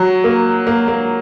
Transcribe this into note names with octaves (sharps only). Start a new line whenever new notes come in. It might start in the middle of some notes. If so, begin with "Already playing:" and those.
Already playing: F#3
A#3
A#3
A#3